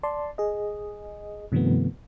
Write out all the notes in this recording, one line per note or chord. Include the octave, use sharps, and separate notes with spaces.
D5 A5 C6
G#4 D#5
G2 C3 D#3 F3 A3 B3